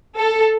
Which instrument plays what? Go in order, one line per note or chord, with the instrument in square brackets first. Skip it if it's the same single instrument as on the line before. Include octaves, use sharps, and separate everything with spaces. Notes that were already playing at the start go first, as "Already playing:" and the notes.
[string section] A4